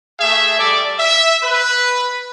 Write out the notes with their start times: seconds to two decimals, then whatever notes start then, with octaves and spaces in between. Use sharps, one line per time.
0.20 A3 G#4 E5
0.59 G3 A4 D5
0.99 E5
1.43 B4